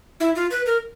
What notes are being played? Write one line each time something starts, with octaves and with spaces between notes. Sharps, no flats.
E4
F4
B4
A#4